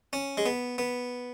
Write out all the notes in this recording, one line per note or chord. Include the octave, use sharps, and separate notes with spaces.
C#4
G#3
B3
B3